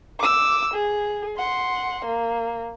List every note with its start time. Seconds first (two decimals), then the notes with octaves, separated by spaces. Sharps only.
0.20 D6 E6
0.74 G#4
1.38 F#5 C6
2.06 A#3